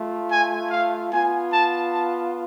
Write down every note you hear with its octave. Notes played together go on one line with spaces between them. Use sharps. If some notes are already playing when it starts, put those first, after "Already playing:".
Already playing: A3 F4
G#5
F5
B3 F4 G#5
A5
A5